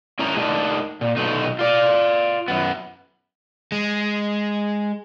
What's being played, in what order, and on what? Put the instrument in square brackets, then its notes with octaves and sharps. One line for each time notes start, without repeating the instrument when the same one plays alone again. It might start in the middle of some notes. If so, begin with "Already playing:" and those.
[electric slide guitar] C#4 E4 G#4 A#4 A#5
A3 D4 D#4 A#4 D#5
A#2
B2 F#3 A3 D#4
F4 D5
F#2 B3
[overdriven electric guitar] G#3